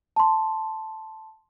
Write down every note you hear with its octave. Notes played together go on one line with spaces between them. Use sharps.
A5 C6